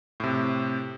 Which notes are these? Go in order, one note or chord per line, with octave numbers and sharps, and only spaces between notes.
A2 C3